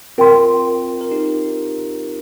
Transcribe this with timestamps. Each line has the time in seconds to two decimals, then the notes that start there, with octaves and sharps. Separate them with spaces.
0.18 C4 F4 A#4 G5 C6
1.01 A#4
1.11 D#4 G4